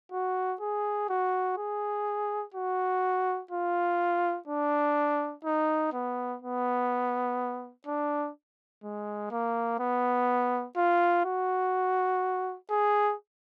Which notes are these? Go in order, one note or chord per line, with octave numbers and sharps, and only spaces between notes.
F#4
G#4
F#4
G#4
F#4
F4
D4
D#4
B3
B3
D4
G#3
A#3
B3
F4
F#4
G#4